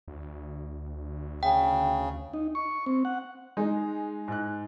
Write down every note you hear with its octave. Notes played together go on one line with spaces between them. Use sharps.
D2
C#3 G5
D#4
C#6
C4
F#5
G#3 D#4
G#2 F#6